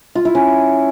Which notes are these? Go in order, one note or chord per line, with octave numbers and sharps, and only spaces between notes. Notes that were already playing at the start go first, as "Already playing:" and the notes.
F4
E4
C#4